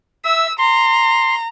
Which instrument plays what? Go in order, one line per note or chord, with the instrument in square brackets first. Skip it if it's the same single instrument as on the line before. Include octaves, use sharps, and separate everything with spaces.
[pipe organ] E5 [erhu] E6
[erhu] A#5 [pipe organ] C6